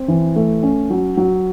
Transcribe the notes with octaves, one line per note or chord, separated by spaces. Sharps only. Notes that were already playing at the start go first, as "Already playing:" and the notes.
Already playing: C4
E3
A3
C#4
F#3
F#3